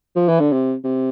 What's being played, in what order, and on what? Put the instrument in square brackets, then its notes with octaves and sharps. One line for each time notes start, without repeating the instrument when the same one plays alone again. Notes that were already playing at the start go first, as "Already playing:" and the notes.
[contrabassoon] F3
E3
D3
C3
C3